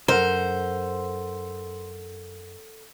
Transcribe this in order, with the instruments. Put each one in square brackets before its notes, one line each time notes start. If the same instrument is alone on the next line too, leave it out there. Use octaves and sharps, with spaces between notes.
[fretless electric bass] F#2 [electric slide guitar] A4 F#5 [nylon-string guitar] A#4 [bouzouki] C5